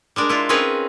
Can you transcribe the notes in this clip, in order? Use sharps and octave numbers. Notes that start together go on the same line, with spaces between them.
G3 G#3 D4 A#4
E4 F4
C4 C#4 D#4 G#4 A#4 B4